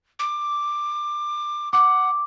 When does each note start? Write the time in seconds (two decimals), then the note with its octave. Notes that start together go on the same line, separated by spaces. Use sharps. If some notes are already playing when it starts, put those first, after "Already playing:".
0.19 D6
1.73 F#5 D6